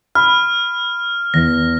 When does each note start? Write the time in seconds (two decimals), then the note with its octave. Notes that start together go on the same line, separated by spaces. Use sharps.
0.15 B5 F6
1.34 E2 A#6